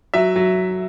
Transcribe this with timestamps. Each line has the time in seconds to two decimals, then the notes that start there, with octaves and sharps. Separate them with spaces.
0.14 F#3 E5
0.36 F#3